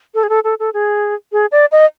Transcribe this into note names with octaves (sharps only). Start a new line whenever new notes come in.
A4
G#4
A4
A4
A4
G#4
G#4
D5
D#5